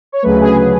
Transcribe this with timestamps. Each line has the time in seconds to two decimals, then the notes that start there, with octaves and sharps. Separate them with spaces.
0.12 C#5
0.23 D2 C#3 F#3 A3 B4
0.41 G#4
0.57 G#4